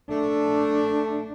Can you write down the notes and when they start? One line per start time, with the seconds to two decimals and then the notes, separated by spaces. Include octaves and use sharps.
0.10 A3 D4